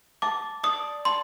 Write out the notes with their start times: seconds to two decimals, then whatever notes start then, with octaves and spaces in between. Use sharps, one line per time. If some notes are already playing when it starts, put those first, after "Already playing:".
0.22 A5 D6
0.63 D5 D#6
1.05 A5 C6